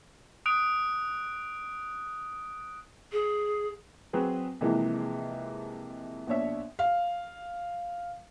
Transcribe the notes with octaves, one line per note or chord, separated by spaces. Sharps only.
D#6 F#6 D7
G#4
F#3 C4 G#4 B4
C3 E3 F3 G#3 A#3
A#1 B2 D4 C#5 E5
F5